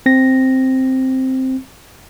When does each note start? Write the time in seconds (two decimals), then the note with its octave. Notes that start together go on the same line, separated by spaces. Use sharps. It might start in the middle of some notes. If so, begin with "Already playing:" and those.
0.06 C4 A#6